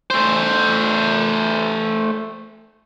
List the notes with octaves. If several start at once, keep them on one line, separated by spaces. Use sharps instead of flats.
A3 C5